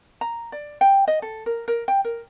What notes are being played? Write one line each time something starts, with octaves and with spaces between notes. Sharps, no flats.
A#5
D5
G5
D#5
A4
A#4
A#4
G5
A#4